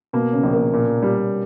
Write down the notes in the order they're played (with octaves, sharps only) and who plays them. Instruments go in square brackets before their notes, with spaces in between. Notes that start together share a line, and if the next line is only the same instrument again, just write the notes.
[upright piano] B2 [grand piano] A#3
[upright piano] C#3
[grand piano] A#1
[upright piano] A#3
[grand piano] A#2
G3